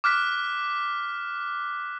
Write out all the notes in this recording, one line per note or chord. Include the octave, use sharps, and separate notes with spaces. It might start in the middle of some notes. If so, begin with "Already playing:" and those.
D6 F6 F#6 B6